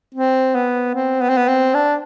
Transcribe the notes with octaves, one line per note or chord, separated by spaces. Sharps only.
C4
B3
C4
B3
C4
B3
C4
D4